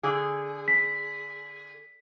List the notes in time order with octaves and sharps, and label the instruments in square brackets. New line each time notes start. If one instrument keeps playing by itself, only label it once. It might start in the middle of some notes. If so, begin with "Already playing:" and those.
[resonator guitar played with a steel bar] D3 G#4
[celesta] B6